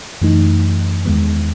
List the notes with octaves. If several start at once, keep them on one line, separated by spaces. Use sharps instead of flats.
F#2 E3 A3 D#4
E2 D#3 G#3 B3